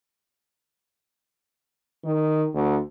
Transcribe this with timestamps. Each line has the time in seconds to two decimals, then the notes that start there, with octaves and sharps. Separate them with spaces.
2.04 D#3
2.54 D2